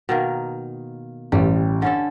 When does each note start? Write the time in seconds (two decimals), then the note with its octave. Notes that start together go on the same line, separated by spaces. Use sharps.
0.09 B2 D#3 A#3
1.32 A1 G3
1.82 D3 C#4 A4